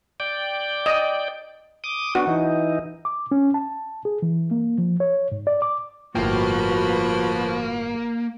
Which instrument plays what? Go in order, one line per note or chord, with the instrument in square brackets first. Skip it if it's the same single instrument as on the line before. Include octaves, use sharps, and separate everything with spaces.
[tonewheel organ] D5 G5
[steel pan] D#5
[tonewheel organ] D6 D#6
[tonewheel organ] B3 D4 [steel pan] F#4
[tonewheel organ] E3 D#4
[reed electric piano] D6
C#4
A5
G#4
E3
A#3
F3
C#5
G#2
D5
D6
[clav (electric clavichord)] G1 A2 G5 [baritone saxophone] F3 [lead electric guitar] A#3 [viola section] F#4 B4